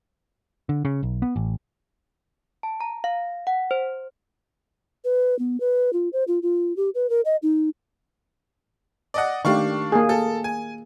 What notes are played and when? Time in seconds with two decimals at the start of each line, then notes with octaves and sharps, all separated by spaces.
0.69 D3
0.85 C#3
1.03 B1
1.22 B3
1.36 A1
2.63 A5
2.81 A#5
3.04 F5
3.47 F#5
3.71 C5
5.04 B4
5.39 B3
5.60 B4
5.93 F4
6.13 C5
6.28 F4
6.43 F4
6.77 G4
6.95 B4
7.10 A#4
7.25 D#5
7.43 D#4
9.14 D5 D#5 F#5
9.45 D#3 A3 D4 G4 F5 C#6
9.92 A#3 G#4
10.09 A4
10.44 G#5